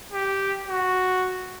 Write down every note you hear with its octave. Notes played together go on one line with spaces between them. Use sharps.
G4
F#4